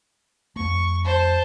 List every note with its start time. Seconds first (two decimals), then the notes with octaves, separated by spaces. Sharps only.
0.56 F2 A3 C#6
1.05 C5 A5